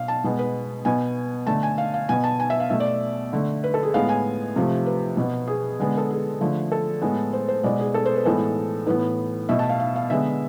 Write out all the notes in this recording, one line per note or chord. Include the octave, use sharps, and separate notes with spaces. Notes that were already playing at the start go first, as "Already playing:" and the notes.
Already playing: B2 F5
A5
B2 G#3 B3
B4
B2 B3 G#5
D3 A3 A5
G#5
F5
F5
B2 B3 G#5
A5
G#5
E5
F5
B2 A3 E5
D5
D3 A3
B4
A4
G#4
A2 G#3 B3 F5
G#5
C3 F3 A3
B4
B2 B3
G#4
D3 G#3 B3
A4
G#4
D3 F3 A3
A4
A2 G#3 B3
C5
C5
B2 G#3 B3 D5
G#4
A4
C5
B4
A2 E3 G#3 B3 A4
A2 E3 B3 B4
B2 A3 E5
A5
F5
F5
F5
D3 G#3 B3 E5